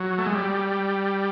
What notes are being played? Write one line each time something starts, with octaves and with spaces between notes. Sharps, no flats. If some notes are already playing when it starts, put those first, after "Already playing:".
Already playing: F#3
A3
G#3
G3